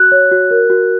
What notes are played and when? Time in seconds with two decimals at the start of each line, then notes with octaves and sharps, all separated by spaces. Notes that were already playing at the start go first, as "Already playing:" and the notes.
Already playing: F#4 F#6
0.12 C#5
0.31 F#4
0.51 A#4
0.70 F#4